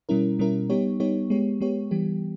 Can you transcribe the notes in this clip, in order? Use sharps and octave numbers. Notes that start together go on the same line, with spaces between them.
B2 G3 C#4 E4 A#4
B2 G3 C#4 E4 A#4
G3 B3 D#4 G4 C#5
G3 B3 D#4 G4 C#5
G#3 B3 G4 C#5
G#3 B3 G4 C#5
E3 G3 B3 G4